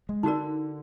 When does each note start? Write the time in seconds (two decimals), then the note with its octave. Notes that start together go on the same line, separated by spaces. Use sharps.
0.09 G#3
0.23 D3 D#4 F#4 A#4 D5